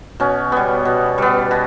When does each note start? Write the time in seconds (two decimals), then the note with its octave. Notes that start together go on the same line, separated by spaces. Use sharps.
0.20 B2 C#4
0.52 G3 B3
0.85 B2
1.18 G3 B3
1.51 B2